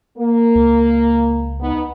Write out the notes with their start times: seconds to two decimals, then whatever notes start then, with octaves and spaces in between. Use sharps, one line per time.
0.16 A#3
0.55 C#2
1.60 B3 D#4